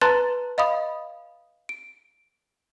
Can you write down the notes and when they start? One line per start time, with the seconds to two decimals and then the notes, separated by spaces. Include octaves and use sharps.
0.01 B4 A5 A#5 C6 F#6 A6
0.58 D#5 F5 B5 D#6
1.69 D7